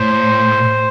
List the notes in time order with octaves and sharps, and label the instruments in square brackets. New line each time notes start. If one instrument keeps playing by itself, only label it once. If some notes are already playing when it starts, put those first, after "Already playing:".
Already playing: [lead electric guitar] A2 [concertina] C5